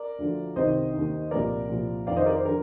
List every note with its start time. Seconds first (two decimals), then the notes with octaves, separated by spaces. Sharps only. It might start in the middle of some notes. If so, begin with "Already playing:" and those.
Already playing: A#4 D5
0.18 D2 D3 F3
0.56 C2 C3 D#3 C5 D#5
0.93 D#2 D#3
1.31 C2 A#2 F3 A#4 D5
1.70 C2 A#2 F3
2.07 F2 D#3 D5 F5
2.16 C5 D#5
2.26 A#4 D5
2.36 C5
2.45 D3 F3 A#4